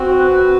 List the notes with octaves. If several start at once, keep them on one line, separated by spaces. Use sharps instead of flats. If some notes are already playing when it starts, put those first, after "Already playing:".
Already playing: C4 F#4
B4